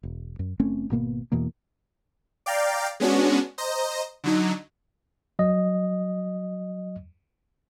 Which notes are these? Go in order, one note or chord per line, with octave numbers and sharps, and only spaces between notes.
E1
F#2
F#1 A3 C4 C#4
G#1 B2 A#3 B3
E2 B2 E3 A#3
D5 F5 G5 A#5
G#3 B3 C#4 D4 F#4
C5 D#5 A#5
D3 F#3 D#4
F#3 D#5